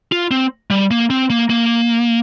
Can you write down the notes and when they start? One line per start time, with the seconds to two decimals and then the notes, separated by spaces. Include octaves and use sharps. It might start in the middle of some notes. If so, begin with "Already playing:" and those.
0.12 F4
0.31 C4
0.70 G3
0.91 A#3
1.10 C4
1.30 A#3
1.50 A#3